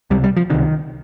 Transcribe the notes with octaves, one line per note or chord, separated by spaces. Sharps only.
C#2 C3 G3
G3
F3
C#2 C3 D#3